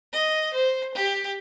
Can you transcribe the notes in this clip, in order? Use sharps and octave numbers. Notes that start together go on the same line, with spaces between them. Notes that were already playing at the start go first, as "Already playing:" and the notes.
D#5
C5
G4